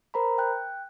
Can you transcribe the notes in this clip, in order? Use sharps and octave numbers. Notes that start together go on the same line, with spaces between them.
A#4 C5 A#5 B5
G5 F#6